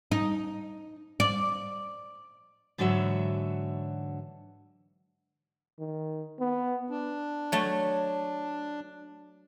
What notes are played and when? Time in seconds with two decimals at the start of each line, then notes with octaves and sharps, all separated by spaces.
0.12 D#4
1.20 D5
2.78 G#2 D3 E3 F#3 F#4 E5
5.79 D#3
6.40 B3
6.88 D4
7.52 F#3 A3